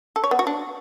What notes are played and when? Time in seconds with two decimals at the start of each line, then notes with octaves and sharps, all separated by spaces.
0.16 A4
0.24 C#5
0.31 B3
0.39 F#4
0.47 D4